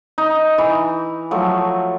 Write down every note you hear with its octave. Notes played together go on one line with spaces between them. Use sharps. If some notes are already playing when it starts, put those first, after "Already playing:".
D#4
E3
F3 F#3 A3